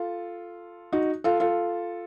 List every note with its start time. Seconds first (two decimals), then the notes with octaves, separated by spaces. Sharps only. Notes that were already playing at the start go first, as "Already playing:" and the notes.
Already playing: F4 A4
0.92 D#4 F#4
1.24 F4 A4
1.40 F4 A4